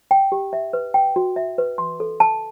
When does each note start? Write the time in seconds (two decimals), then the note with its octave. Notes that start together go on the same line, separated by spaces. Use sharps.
0.11 G5
0.32 G4
0.53 E5
0.73 B4
0.94 G5
1.16 F#4
1.36 E5
1.58 B4
1.78 C6
2.00 A4
2.20 A5